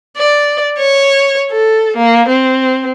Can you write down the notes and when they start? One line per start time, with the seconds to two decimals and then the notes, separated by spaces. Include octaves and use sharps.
0.18 D5
0.79 C#5
1.51 A4
1.97 A#3
2.29 C4